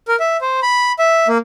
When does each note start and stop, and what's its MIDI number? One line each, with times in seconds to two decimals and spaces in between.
0.08 0.16 70
0.20 0.37 76
0.41 0.60 72
0.63 0.92 83
0.99 1.27 76
1.28 1.38 58